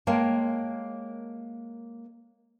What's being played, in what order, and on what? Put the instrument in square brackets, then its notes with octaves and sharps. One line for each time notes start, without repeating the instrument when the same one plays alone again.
[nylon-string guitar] G#3 A#3 A#4 C#5 G5 A5